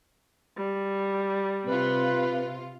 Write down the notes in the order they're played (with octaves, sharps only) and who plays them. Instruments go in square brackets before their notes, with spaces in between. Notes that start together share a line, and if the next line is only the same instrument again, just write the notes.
[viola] G3
[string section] C3 F4 [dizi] B4